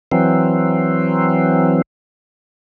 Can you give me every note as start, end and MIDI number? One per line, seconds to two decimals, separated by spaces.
0.12 1.82 52
0.12 1.82 54
0.12 1.82 60